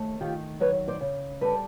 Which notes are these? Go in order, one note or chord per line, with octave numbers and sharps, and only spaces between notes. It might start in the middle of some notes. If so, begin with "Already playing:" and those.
Already playing: D#2 A3
D#3 F4 G4
F#3 B4 C#5
C5 D5
C#3
G3 A4 B4